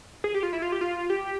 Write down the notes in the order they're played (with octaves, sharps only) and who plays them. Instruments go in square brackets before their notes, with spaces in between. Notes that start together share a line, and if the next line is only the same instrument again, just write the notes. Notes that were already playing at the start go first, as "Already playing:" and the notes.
[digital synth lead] G#4
G4
F4
E4
F4
G4
F4
G4